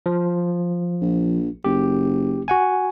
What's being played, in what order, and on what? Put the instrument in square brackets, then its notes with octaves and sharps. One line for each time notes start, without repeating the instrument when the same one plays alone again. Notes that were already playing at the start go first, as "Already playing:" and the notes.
[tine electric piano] F3
[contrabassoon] A#1
[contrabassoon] F#1 [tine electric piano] G4
[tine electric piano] F#4 F#5 G#5